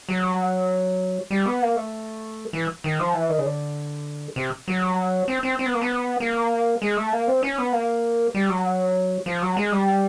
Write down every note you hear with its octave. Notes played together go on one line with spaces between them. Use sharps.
F#3
G3
B3
A#3
A3
E3
D#3
F3
E3
D#3
C#3
D3
C3
F#3
C4
C4
C4
B3
A#3
B3
A#3
G#3
A3
A#3
C4
C#4
B3
A#3
G3
F#3
F3
F#3
G#3
G3